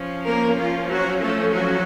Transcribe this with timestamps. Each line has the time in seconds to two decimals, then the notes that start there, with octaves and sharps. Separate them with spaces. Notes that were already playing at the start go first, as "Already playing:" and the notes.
Already playing: F3 C#4
0.25 A#3 A#4
0.58 F4
0.89 F#3 F#4
1.21 A3 A4
1.53 F#3 F#4